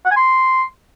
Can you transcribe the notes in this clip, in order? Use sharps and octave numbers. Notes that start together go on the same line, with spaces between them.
F#5
G#5
C6